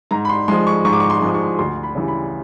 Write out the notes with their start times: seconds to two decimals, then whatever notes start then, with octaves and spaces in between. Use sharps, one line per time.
0.11 G#2 A#5
0.25 B5
0.29 C6
0.48 F3 G#3 C6
0.67 C#6
0.85 G#2 C#6
0.93 D6
1.00 C#6
1.10 C6
1.22 F3 G#3
1.34 C#6
1.59 D2 C6
1.83 B5
1.95 C#3 E3 G3
2.08 B5